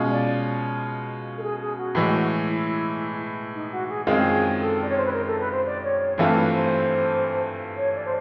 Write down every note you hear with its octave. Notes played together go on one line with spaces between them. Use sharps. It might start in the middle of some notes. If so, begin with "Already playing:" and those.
Already playing: B2 G#3 C#4 F4
D5
A4
G#4
G#4
F#4
A2 E3 G#3
E4
D#4
F#4
G#4
F#2 D#3 G#3 C4 F4 G#4
A4
D5
C#5
C5
B4
A#4
A4
B4
C5
D5
C#5
C#5
G2 E3 A3 C4 F4 B4
B4
C5
C#5
D5
C5